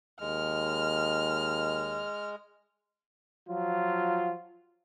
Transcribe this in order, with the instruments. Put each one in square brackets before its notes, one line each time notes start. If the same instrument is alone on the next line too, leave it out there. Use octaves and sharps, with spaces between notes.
[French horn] D#2 [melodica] G#3 [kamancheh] F6
[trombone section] F3 F#3 F4